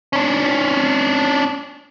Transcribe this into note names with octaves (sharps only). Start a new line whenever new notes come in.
C#4 D4